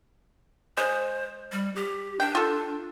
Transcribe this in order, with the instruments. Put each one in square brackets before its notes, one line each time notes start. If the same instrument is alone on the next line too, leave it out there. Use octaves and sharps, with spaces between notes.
[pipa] G#3 [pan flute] C5
[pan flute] G3
G4
[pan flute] D4 [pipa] G5
[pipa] F4 A4